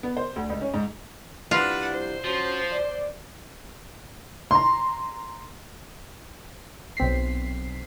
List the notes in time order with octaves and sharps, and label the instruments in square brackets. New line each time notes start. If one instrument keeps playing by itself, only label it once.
[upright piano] B3
C5
D2
C#2
C#4
G#2
[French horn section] C3 G3 E4 [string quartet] D4 B4 F#5 [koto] F4
[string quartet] C5
[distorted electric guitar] F3 [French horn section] C#4 F#4
[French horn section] D5
[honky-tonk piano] A#5 C6
[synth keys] B1 C4 B6 C7